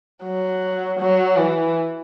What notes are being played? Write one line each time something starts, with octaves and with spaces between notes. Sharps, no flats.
F#3
F#3
E3